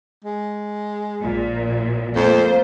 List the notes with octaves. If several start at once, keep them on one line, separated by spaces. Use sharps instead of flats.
G#3
A#1 A#2
F2 A3 A#3 C5